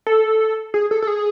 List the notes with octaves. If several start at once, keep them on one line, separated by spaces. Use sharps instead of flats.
A4
G#4
A4
A4
G#4